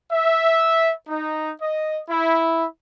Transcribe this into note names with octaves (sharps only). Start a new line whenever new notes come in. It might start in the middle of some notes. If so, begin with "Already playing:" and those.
E5
D#4
D#5
E4